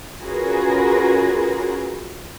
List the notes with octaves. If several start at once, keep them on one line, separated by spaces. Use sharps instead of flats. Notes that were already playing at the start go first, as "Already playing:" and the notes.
C#4 F4 F#4 G#4 A#4 B4